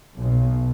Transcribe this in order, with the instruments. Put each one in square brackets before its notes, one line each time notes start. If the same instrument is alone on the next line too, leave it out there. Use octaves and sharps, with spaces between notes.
[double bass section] B1